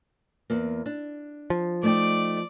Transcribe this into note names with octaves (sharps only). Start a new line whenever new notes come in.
E2 A#3
D4
F3
A3 D#4 D5 G5